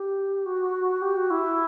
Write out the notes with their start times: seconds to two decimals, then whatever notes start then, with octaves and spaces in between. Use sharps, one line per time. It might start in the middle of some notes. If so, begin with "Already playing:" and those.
Already playing: G4
0.46 F#4
1.02 G4
1.16 F#4
1.30 E4